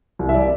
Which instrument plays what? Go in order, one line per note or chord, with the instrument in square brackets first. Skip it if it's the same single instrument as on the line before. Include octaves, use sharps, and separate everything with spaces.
[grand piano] C2
E5
D5